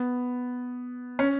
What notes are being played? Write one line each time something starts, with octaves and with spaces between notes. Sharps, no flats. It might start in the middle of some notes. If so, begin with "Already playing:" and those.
Already playing: B3
C#4